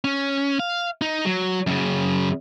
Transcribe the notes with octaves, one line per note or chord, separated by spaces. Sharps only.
C#4
F5
D#4
F#3
F#2 C#3